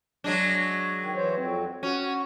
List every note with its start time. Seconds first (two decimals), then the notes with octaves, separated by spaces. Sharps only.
0.24 F#3 G#3 D4
1.00 D#3
1.16 E3 C5 C#5
1.36 F2 C4
1.83 C#4 F#4